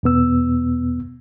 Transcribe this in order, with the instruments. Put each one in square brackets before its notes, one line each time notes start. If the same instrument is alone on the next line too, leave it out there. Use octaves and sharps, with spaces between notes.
[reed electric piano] E2 B2 B3 E6